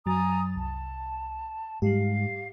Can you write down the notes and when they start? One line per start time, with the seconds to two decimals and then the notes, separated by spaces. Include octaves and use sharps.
0.06 F#2 F#3 G#5 A#5 D#6 A6
0.56 C2 A5
1.82 G#2 G3 G4 F5